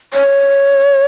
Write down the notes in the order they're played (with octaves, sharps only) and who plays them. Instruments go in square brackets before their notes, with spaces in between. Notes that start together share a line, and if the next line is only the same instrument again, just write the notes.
[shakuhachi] C#5